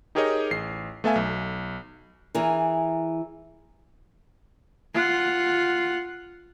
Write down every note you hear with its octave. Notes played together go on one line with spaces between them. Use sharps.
D#4 G4 G#4 A#4 C#5 D#5
A1 C7
A3 B3 A4 E5 F5 G#5
B1
E3 G#4 A#4
F4 F#5